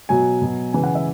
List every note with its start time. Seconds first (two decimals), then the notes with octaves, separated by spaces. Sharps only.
0.09 B2 F#3 G#5
0.42 B2 F#3
0.73 C#3 E3 G#5
0.84 F#5
0.95 E5